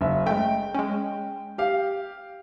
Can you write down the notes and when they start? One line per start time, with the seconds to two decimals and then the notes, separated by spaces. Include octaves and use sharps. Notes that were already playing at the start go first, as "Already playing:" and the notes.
0.01 F#1 E5
0.26 G#3 A3 G5
0.75 G#3 C#4
1.58 G4 F5